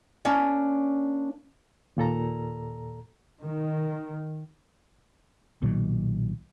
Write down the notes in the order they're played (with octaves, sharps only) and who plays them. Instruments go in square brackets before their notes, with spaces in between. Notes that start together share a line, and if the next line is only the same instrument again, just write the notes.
[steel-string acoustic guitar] A#3 C#4 D4
[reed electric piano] D#2 A#2 A4 A#5
[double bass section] D#3
[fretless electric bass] B1 A#2 D#3 F#3